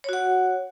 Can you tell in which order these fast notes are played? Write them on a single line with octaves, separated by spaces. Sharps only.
C#5 F#4 F#5